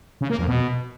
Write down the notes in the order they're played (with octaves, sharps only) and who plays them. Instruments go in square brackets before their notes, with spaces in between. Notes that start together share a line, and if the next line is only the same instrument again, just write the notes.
[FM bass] C#3
A#3
F2
B2